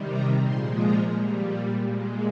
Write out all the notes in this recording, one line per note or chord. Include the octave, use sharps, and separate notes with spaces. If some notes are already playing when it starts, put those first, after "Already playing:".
Already playing: C3 D#3 G3
A#5
A#2 F3 G#3 C6
A#5
A#2 G3
A#2 G#3